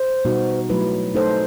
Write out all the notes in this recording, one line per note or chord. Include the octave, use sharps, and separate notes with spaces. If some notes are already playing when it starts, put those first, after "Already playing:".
Already playing: C5
B2 G3 B3 D#4 F#4
F#3 A3 E4 B4
A3 D#4 A4 C5